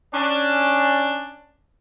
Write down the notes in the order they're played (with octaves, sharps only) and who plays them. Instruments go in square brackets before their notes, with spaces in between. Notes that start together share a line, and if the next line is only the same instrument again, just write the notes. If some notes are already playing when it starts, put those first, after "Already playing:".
[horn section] C#4 D4